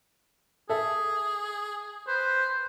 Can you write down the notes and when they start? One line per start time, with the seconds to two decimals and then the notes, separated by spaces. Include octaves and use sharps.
0.69 G#4 A4 E5
2.08 B4 C5